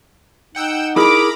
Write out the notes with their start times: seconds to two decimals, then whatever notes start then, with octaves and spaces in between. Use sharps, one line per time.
0.55 D#4 F#5 G5 E6
0.96 E4 G#4 A#4 A#5 B5 D6